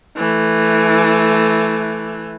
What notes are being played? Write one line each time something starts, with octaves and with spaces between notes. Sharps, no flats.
E3 A3